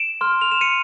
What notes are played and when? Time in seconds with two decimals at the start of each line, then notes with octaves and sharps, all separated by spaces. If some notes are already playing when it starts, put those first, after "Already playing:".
Already playing: D7 E7
0.21 C6 F6
0.41 F7
0.52 E7
0.61 C#7 D#7